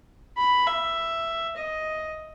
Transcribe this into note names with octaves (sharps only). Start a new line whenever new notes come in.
B5
E5
D#5